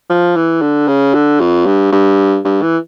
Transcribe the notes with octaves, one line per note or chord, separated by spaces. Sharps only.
F3
E3
D3
C#3
D3
F2
G2
G2
G2
E3